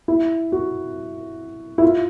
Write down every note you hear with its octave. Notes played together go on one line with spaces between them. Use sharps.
E4
F#4
E4
F4